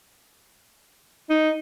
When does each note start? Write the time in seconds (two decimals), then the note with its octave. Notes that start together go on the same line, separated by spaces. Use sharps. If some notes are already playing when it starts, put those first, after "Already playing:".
1.30 D#4